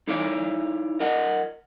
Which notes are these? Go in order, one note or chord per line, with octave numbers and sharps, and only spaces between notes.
D#4 E4 A4 C#5 D5 F5
A#4 D#5 F#5